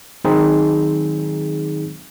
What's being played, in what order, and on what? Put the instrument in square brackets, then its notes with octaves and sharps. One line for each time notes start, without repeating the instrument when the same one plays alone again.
[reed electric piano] D#3 F#3 G#3 C4 D#4 G#4